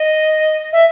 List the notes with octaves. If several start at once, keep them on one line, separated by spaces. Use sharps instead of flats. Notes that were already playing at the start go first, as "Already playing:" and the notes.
Already playing: D#5
E5